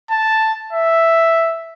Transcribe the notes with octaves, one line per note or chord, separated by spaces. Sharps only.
A5
E5